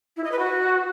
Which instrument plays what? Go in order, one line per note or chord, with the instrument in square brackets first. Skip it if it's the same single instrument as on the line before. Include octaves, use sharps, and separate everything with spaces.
[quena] E4
D#5
B4
F#4